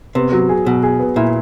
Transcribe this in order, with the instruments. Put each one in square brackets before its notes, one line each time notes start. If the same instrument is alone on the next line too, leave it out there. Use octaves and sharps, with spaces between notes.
[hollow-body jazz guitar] C3 [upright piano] B3
[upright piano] F#3
G#4
[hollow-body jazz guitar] B2 [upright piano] F#3
[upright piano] G#4
B3
[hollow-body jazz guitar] A#2 [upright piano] E4